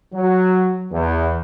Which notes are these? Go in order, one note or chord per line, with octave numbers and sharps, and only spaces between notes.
F#3
E2